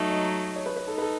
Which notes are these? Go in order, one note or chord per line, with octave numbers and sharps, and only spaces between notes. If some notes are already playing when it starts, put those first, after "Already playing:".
Already playing: F#3 A3 D#4 E5
D#5
C#5
B4
B4
D#4 A4
B4
A4